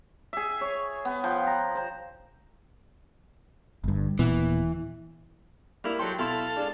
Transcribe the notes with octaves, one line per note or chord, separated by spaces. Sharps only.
G#4 E5
C#5
B3
F3 G5
A#5
C5 A#5
G1 G2
D#1 A#2 E3 B3
G3 A#3 E4 F6
F#3 G4 A4 C6
B2 E4 A4 F5 C6
G#3 D4